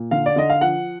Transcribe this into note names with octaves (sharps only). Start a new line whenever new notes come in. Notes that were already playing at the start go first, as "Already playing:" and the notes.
Already playing: A#2
D3 F5
D5
D3 D#5
F5
F3 F#5